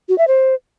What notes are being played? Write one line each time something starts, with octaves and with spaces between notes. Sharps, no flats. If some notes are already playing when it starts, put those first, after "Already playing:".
F#4
E5
C5